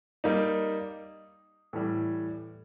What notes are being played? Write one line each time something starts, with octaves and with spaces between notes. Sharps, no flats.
G3 A#3 D#4
A2 E3 G3